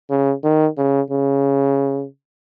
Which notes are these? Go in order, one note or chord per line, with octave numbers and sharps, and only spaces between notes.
C#3
D#3
C#3
C#3